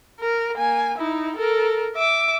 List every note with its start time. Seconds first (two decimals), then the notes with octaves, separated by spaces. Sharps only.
0.20 A#4
0.56 A#3 G#5
0.98 D#4 E4
1.36 A4 A#4
1.96 E5 D6